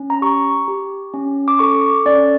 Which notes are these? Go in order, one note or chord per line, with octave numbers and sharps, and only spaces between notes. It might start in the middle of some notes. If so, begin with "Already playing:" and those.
Already playing: C#4
A#5
G4 C#6
G4
C#4
D6
A4 C#6
C#4 D5